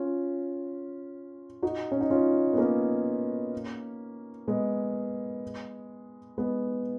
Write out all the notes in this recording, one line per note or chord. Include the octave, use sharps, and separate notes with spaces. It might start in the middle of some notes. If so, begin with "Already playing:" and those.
Already playing: C#4 F4
D#4 F#4
C#4
D#4
C#4 F4
B3
A#3 C#4
G#3 B3
G#3 B3